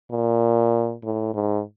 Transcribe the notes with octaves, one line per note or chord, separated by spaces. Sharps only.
A#2
A2
G#2